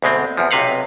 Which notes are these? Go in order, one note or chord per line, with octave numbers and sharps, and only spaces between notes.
D2 B2 G#3 C4
E2 F3
B1 C3 B4 F5 F#5